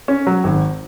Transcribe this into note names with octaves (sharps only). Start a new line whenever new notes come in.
C#4
F#3
G#1